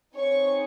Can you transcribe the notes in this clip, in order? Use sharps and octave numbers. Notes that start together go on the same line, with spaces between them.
C4 D#4 G#4 C#5 C#6